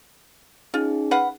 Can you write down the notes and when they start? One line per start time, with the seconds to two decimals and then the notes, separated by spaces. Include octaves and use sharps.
0.74 C#4 D#4 F4 G#4
1.11 B4 F5 F#5